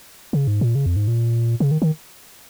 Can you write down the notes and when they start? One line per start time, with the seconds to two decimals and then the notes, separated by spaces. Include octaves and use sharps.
0.33 C#3
0.47 G#2
0.61 A#2
0.75 C#3
0.86 F2
0.96 G#2
1.08 A#2
1.60 C#3
1.71 D#3
1.82 D#3